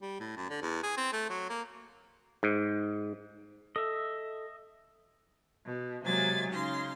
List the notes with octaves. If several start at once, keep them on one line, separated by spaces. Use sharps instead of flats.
G3
A2
F#2
D3
E2
G#4
C4
A3
F#3
A#3
G#2
A4 D#5 E5
B2
C3 F#3 G#3 A#3 G#5 A6
C#3 D#4 F5 C6